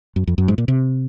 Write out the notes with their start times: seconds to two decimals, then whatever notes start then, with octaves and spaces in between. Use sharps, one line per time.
0.16 F#2
0.27 F2
0.38 F#2
0.48 G#2
0.58 A#2
0.68 C3